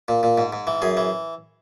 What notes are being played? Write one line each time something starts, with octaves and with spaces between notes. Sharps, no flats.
A#2
A#2
G#2
G#2
E3
F#2 G#4
E3